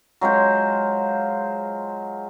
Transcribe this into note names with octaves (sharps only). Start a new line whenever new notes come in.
F#3 G#3 F4 C5